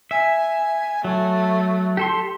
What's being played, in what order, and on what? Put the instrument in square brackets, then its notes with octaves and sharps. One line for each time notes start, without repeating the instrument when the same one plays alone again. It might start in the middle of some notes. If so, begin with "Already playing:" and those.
[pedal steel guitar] E5 [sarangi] G#5
[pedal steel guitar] F#3 [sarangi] A3
[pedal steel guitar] G4 A4 C6